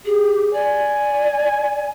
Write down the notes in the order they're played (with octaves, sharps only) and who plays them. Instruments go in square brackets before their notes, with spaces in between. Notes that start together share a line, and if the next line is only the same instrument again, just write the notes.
[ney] G4 [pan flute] G#4
[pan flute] D5 [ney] G#5